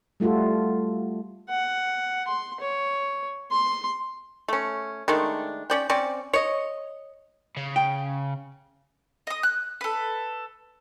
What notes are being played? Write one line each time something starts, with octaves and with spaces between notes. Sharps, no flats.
G3 A3 F4 F#4 A4
F#5
C6
C#5
C6
A3 C#4
D#3 G#3 A3 D4
C#4 D5 G5
C4 C#4 D5
C#5 D#5
C#3
G5
D#5 D#6
F#6
A4 B4